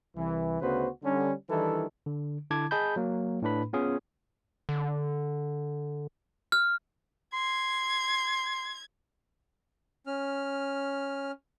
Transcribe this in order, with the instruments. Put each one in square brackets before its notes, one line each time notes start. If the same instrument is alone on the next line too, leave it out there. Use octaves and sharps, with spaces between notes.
[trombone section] C2 E3
D2 C#3 B3 F#4 B4 C5
D3 G3 C#4
D#3 E3 G3 D4 E4 A4
[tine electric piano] D3
D3 E4 A5 D6 G#6
G#4 D#5 A5 B5 G6
F#3 A#3
A2 A3 D4 B4 B5
B3 C#4 F4 G#4
[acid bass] D3
[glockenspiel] F6
[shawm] C6 [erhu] G#6
[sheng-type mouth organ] C#4 F6